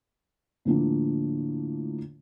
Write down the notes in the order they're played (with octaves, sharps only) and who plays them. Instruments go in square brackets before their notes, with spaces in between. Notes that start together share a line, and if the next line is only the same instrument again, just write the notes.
[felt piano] A2 D3 F3 A#3 D4